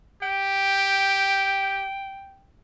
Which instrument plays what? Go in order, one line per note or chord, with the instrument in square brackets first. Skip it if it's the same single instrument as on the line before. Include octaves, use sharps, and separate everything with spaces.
[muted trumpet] G4 [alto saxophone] G5